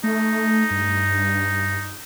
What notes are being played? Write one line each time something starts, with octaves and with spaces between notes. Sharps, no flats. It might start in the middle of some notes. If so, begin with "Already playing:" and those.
A3 D#4
G2